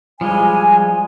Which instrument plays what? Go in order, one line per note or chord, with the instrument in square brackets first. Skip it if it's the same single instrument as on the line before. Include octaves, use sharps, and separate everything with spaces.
[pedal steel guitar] F3 G3 G#3 [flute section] G#5